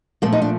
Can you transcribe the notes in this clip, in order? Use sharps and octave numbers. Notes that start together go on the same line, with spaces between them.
A#2 F3 A3 A#3
D#4
D4